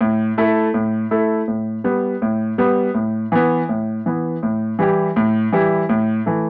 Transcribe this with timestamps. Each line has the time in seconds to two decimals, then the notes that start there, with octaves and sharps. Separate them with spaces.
0.01 A2
0.38 A3 E4 A4
0.74 A2
1.11 A3 E4 A4
1.48 A2
1.84 G3 B3
2.22 A2
2.58 G3 B3
2.94 A2
3.32 E3 B3
3.69 A2
4.06 E3 B3
4.43 A2
4.79 E3 G3 E4 G4
5.16 A2
5.52 E3 G3 E4 G4
5.89 A2
6.26 E3 A3